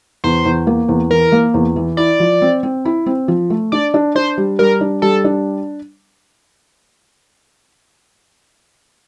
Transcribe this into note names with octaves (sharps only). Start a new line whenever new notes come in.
E2 C5
E2
A#3
E2
E3 A#4
A#3
E2
E3
E4 D5
F3
C4
C4
E4
C4
F3
A3
D4 D5
D4
D4 C5
G3
G3 A#4
D4
G3 A4
D4